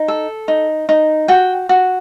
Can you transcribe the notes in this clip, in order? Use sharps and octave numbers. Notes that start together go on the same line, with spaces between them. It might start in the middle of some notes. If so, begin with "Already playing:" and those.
Already playing: D#4
A4
D#4
D#4
F#4 G5
F#4